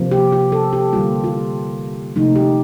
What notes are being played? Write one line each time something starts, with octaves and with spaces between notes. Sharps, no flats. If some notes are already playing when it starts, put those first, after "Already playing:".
Already playing: C3 F3 A#3
G4
G4
A4
G4
D3 G3 A#3 F4
F4
C3 F3 A3 D#4
G4